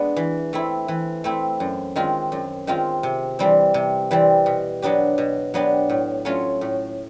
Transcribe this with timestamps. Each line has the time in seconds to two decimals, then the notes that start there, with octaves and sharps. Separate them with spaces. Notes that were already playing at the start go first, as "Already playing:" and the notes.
Already playing: G#3 B3 D4
0.17 E3
0.53 A3 C4 E4
0.88 E3
1.24 A3 C4 E4
1.60 F#2
1.96 D#3 G#3 C4 F4
2.32 F#2
2.67 D#3 G#3 C4 F4
3.03 C3
3.39 E3 G3 C4
3.74 C3
4.11 E3 G3 C4
4.46 B2
4.82 F#3 B3 D4 G4
5.18 B2
5.54 F#3 B3 D4 G4
5.90 A2
6.25 F#3 A3 C#4 F4
6.61 A2